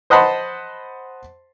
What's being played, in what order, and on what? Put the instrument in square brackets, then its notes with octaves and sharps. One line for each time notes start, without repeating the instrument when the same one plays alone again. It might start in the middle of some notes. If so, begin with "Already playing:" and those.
[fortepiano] C5 D#5 F#5 A5 B5 C6